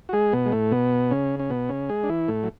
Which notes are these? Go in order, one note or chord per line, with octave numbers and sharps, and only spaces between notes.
F#4
G#3 G#4
B2 B3
G#3
A2 A3
B2 B3
C#3 C#4
C#4
B2 B3
C#3 C#4
G#3 G#4
D4
E3 E4
A2 A3
F#3